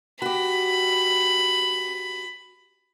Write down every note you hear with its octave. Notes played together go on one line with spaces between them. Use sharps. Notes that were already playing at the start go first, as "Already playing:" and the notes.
F#4 G4 B5